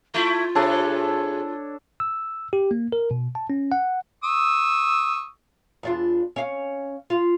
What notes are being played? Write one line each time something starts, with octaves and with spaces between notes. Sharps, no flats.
A3 E4 F4
C3 D4 G#4 A4 C#5
E6
G4
A#3
A#4
B2
A5
C#4
F#5
C#6 D#6 E6
E2 D4 F4
C#4 F5
F4